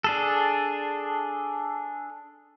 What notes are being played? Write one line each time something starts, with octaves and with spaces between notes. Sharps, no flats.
D4 G#4 A4